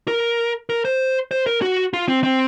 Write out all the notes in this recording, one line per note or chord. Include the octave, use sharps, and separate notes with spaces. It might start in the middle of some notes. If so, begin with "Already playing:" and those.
A#4
A#4
C5
C5
A#4
F#4
F4
C4
C4